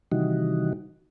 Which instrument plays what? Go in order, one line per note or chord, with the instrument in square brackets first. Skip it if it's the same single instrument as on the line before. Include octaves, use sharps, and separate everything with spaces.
[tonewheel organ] C3 D#3 E3 G3 D#4 F#4